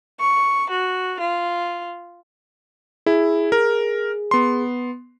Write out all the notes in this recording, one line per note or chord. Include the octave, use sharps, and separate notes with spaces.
C#6
F#4
F4
E4 G#4
A#4
B3 C6